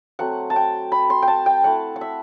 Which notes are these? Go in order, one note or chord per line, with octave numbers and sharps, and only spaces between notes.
F#3 A3 C4 F#5
A5
G5
B5
C6
G5
A5
G5
A3 E4 F#5
F#5
E5